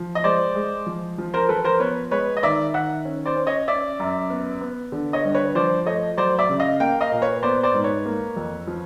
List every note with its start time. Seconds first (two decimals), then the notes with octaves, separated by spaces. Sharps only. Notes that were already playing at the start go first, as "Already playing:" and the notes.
Already playing: F3
0.15 D#5
0.23 G#3 C5 D5
0.55 G#3
0.86 F3
1.18 F3
1.34 A#4 C5
1.49 F3 A4 B4
1.64 A#4 C5
1.80 B3 B4 C#5
2.11 G#3 B4 C#5
2.37 D#5
2.43 D#3 D5 E5
2.74 D#3 E5 F#5
3.05 C#4
3.26 C5 D5
3.36 C#4
3.47 C#5 D#5
3.68 C#4 D5 E5
3.99 F#2
4.30 B3
4.61 B3
4.92 D3
5.13 C#5 D#5
5.24 G2
5.35 B4 C#5
5.55 F3 C5 D5
5.86 A3 C#5 D#5
6.18 F#3 C5 D5
6.39 D5 E5
6.49 C#3
6.60 D#5 F5
6.80 A#3 F5 G5
7.01 D#5 F5
7.12 A#2
7.22 B4 C#5
7.43 B3 C5 D5
7.63 C5 D5
7.74 G#2
7.84 B4 C#5
8.06 A#3
8.36 F2
8.67 F3